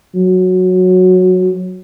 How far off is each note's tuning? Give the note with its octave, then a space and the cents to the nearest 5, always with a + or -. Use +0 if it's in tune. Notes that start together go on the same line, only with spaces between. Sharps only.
F#3 -10